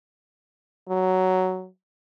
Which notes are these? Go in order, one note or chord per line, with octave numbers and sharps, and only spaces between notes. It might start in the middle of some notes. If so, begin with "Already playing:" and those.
F#3